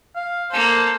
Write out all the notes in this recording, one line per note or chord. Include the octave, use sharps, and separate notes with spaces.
F5
A#3 A4 C5